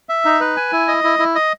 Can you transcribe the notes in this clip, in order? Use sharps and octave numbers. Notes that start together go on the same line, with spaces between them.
E5
D#4
B4
G#5
E4
D#5
E4
E4
D#5